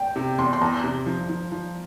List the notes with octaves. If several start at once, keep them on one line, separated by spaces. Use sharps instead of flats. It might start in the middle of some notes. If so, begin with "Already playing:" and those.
Already playing: G5
C3
E2 C6
C6
E2 A#5
C3
F3
F3
F3